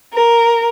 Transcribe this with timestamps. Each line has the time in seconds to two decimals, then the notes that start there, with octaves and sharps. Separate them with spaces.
0.14 A#4